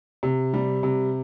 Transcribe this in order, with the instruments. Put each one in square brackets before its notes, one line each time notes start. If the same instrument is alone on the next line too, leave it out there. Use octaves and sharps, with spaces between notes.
[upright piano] C3
G3
C3